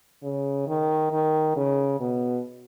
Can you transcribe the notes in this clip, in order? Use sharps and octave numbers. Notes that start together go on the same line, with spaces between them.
C#3
D#3
D#3
C#3
B2